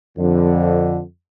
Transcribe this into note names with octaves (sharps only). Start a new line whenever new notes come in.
F2 D3